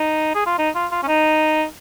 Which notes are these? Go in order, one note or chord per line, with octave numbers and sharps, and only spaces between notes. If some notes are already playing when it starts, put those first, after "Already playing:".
Already playing: D#4
G#4
F4
D#4
F4
F4
C#4
D#4